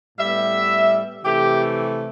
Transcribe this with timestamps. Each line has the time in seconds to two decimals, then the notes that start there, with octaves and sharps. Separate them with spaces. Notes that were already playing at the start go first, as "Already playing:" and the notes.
0.18 A2 G3 B3 E5
1.24 C3 E3 A3 G4